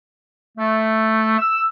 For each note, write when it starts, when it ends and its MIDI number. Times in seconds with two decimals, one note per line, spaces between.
0.57 1.36 57
1.39 1.62 88